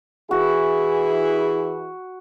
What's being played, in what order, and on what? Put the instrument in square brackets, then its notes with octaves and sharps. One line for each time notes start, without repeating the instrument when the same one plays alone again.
[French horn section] E3 E4 G#4 [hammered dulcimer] F#4